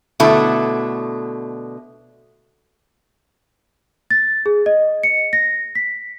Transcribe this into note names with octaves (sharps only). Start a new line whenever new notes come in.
B2 D3 A3 E4
A6
G#4
D#5
C#7
A#6
B6